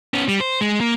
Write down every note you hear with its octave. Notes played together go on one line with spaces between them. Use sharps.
B3 C#4
G3
C5
G#3
A#3